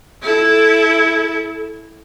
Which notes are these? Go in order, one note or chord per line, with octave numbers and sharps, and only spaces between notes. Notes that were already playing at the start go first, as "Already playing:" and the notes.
E4 A4